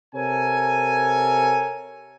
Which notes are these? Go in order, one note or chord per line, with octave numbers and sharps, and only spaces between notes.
C3 A4 A#4 C#5 G#5